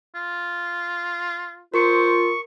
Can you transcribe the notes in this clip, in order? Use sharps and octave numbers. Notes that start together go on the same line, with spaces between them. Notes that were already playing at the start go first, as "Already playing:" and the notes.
F4
F4 A#4 C5 C#6